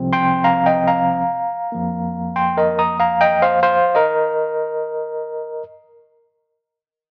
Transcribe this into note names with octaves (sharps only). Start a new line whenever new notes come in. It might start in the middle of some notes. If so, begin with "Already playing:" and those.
Already playing: C2 C3 F3 C4
G5 C6
F5 A#5
D#5 G5
F5 A#5
F2 F3 A#3
G5 C6
A#4 D#5
A#5 D#6
F5 A#5
D#5 G5
C5 F5
C5 F5
A#4 D#5